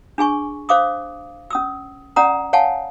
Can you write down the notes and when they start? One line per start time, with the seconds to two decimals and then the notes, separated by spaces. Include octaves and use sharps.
0.18 D4 G#4 G#5 C#6
0.69 C5 F5 D6 D#6
1.50 C#4 D#6 E6
2.16 C#4 D5 F#5 A#5 D#6
2.53 C#5 F5 F#5 G#5 A5